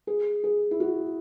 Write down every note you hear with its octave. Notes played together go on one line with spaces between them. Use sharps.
G#4
G#4
E4
F#4